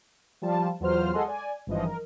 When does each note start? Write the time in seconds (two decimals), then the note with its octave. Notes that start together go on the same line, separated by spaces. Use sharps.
0.42 F3 G3 F4 A5
0.80 E2 F#3 F4 C5 F6
1.13 G#3 A4 D#5 F#5 G#5 C6
1.28 D5 G#5
1.67 G#1 G2 E3 F3 D#5
1.85 A#4